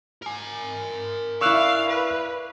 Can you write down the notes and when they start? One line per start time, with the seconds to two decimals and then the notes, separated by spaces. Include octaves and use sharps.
0.22 A#4 G#5
1.41 E4 D5 F5 C#6 E6 F#6
1.90 B4